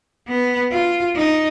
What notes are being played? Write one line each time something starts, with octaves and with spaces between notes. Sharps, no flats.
B3
F4
D#4